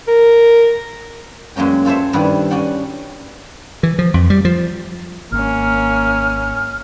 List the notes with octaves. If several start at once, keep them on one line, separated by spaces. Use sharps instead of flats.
A#4
F#2 G#3 A#3 C#4 G5
F4 A4 C5 C#5 E5
G2 D#3 E4 D5 F#5
C#4 F#4 D5 F#5 G5
E3
F3
F2
G3
F3
G#1 A#3 C#4 F6